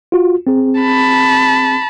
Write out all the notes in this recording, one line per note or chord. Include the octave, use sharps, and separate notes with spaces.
F4 F#4
C4 G#4
A5 B5